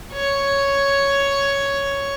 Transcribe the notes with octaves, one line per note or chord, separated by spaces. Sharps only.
C#5